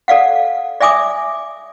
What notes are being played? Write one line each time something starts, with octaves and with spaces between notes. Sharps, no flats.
A4 D5 F5 F#5
D5 E5 G#5 D6 D#6